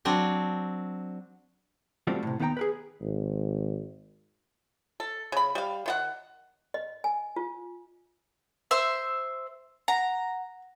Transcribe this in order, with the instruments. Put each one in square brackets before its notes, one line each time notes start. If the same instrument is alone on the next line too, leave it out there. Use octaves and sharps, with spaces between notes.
[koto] F#3 C4 D4
[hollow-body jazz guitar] G3 A3 C4 D4 F4 F#4
A2 C3
D#2 B3 D#4 C5 G5 A#5
G#4 A#4 B4
[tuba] G#1
[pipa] A4
C#3 B5
G3 F5
D#3 F4 F#5
[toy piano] D#5
G#5
F4
[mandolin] C5 E5 E6
[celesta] F#5 [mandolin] A#5